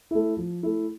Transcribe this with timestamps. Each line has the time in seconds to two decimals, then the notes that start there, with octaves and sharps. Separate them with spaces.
0.11 A3 E4
0.37 F3
0.63 A3 E4